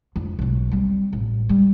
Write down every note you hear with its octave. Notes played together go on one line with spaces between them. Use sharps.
F2 D3
B1 F#3
G3 C4
A1
G3